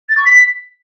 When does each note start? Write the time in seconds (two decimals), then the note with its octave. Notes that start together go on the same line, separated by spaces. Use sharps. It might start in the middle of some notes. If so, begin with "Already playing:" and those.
0.09 A6
0.17 C#6
0.25 B6